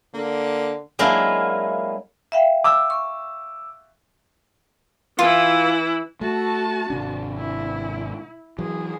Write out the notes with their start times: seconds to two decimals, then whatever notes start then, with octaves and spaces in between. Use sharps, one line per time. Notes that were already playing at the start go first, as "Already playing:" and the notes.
0.14 D3 A#3
0.99 F#3 G#3 A#3 D4 E4 F4
2.32 E5 F5 G5
2.64 D6 E6
2.90 C#6
5.19 E3 E4 F4
6.21 A3 F#4 A5
6.90 G#1 C3 D4
7.38 E4
8.59 E3 F#3 G#4